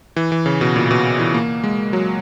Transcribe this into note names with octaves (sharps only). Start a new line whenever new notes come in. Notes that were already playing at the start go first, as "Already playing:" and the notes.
E3
E3
C#3
B2
A#2
B2
E3
A#3
G#3
F#3